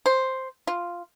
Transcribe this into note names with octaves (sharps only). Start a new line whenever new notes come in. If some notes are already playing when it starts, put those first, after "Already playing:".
C5
F4